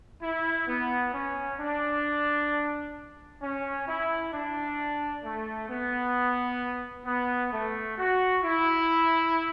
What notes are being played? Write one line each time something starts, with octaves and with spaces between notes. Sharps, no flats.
E4
B3
C#4
D4
C#4
E4
D4
A3
B3
B3
A3
F#4
E4